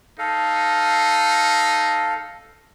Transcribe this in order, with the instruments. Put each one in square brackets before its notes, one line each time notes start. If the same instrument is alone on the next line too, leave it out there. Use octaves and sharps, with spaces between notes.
[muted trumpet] D#4 [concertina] A4 F5